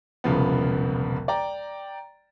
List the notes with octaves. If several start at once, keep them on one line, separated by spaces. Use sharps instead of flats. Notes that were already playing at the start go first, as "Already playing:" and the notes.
E1 C2 C#3 F3 B3
D5 G5 A#5